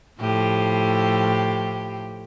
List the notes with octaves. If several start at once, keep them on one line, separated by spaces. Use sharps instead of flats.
A2 F3 G4